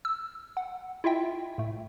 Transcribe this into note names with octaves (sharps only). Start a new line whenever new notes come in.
E6
F#5
E4 F4 D#5 E5 G5
A2 A3